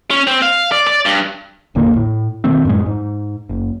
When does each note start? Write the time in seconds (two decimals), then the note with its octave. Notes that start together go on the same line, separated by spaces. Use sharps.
0.11 C#4
0.27 C4
0.42 F5
0.72 D5
0.87 D5
1.06 G2
1.75 E1 A1 D3 A#3
1.96 A2
2.44 B2 D#3 A3 C4
2.65 F#2 A2 G#3
2.86 G#2
3.49 F#1